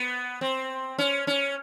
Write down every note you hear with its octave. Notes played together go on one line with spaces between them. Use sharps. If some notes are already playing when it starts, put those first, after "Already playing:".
Already playing: B3
C4
C#4
C#4